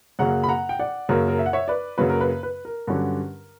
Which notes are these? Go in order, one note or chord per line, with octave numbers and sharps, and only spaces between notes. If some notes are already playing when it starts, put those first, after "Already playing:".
F#2 C#3 F#3 A#3 F#5 A#5
B5
F#5 A#5
G5
D5 F#5
F#2 C#3 F#3 A#3 A#4
A#4
E5
F#5
C#5 E5
B4 D5
F#2 C#3 F#3 A#3 B4
A#4
B4
B4
A#4
G2 D3 F#3 C#4